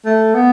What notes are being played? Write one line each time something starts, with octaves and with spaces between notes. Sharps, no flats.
A3
B3